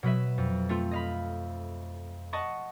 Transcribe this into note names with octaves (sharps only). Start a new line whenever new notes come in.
B2 F#3 B4 E5
F2
A3 C4 F4
D#5 F5 B5
D#5 F#5 A5 C#6